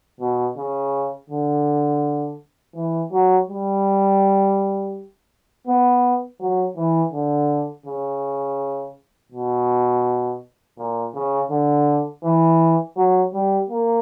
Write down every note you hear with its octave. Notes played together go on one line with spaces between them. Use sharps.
B2
C#3
D3
E3
F#3
G3
B3
F#3
E3
D3
C#3
B2
A#2
C#3
D3
E3
F#3
G3
A#3